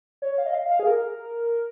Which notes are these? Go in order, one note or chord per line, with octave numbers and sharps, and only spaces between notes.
C#5
F5
D#5
F5
F5
G#4
A#4